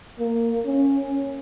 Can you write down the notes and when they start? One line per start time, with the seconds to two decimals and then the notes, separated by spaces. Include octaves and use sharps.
0.19 A#3
0.66 C#4